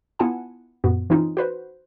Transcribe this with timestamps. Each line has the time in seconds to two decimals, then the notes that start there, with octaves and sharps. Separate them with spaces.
0.19 B3 E4 F4 F#5 G#5 A5
0.84 F#2 A#2 B3 F#4
1.10 E3 C4 C#4 D#4 F4
1.37 F#4 B4 C5